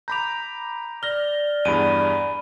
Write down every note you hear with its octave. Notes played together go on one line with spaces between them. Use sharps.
A#5 B5 D6 G6 F7
D5 F6 A#6 G7
E2 G2 G#4 B5 D7 D#7